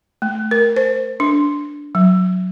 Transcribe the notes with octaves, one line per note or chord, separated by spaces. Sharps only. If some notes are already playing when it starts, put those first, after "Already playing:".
A3
A#4
C5
D4
F#3